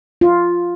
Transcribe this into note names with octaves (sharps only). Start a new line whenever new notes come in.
F4